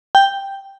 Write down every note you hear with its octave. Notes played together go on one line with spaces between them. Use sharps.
G5